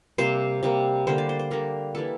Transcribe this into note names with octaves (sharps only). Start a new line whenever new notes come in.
C3 G3 A#3 C5
C3 G3 A#3
D3 G3 A#3 C5
D5
C5
C5
D3 G3 A#3 A#4
E3 G3 A#3 A4